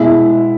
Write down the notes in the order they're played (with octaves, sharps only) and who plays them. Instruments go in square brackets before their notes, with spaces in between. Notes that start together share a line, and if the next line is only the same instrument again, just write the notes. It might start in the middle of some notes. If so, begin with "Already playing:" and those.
Already playing: [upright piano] B2 G#3 E4